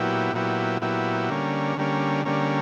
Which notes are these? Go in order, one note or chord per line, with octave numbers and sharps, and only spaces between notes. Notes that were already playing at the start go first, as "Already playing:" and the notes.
Already playing: A#2 F#3 B3 E4 G4
A#2 F#3 B3 E4 G4
A#2 F#3 B3 E4 G4
D3 G3 A#3 C#4
D3 G3 A#3 C#4
D3 G3 A#3 C#4